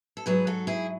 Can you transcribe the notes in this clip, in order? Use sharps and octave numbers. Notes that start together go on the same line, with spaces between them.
A4
G#2 F#3 G#4 B4
F#4 A4
E4 G#4